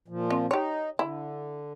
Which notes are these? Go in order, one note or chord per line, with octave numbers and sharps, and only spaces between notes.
A#2 F3
C4
D#4 G4 C#5
D3 E4